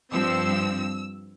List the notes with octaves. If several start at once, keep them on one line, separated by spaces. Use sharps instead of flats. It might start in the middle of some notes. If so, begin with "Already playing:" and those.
G2 F3 C4 E6